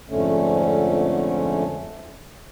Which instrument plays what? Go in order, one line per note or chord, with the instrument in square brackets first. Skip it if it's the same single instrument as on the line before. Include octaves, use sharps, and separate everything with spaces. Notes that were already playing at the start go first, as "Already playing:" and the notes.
[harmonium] F2 G#2 D3 A3 C#4